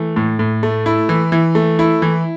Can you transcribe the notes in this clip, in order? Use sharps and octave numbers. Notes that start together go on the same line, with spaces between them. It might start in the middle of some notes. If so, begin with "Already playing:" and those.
Already playing: E3 A3
A2
A2
A3
E4
E3
E3
A3
E4
E3